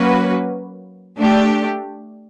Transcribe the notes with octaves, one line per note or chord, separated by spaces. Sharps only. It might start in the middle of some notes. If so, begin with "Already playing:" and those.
Already playing: F#3 A#3 C#4 F#4 B4
A3 D4 G4